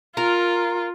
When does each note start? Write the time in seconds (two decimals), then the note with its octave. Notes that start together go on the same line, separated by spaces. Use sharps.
0.17 F4 A#4